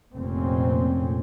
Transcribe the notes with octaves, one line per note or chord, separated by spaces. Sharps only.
F1 F2 A#2 C4 C#4